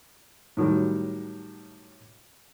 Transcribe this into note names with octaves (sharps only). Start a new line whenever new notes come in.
A2 D#3 F#3 G3